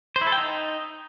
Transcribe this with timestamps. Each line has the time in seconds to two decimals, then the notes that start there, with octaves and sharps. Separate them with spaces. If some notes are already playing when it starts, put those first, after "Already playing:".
0.16 C5
0.21 E4
0.27 A4
0.32 G5
0.38 D#4